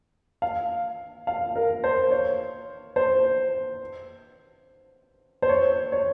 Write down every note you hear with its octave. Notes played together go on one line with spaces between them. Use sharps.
F5
F5
A#4
C5
C#5
C5
C5
C#5
C#5